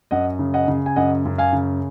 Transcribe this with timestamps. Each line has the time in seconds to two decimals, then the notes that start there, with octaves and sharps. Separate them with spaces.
0.11 F#2 D#5 F#5
0.39 C#3
0.54 D#5 F#5
0.68 C#3
0.86 G#5
0.96 F#2 D#5 F#5
1.25 F#2
1.38 F5 G#5
1.53 C#3